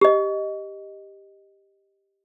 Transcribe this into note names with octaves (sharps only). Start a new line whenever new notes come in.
G4 D#5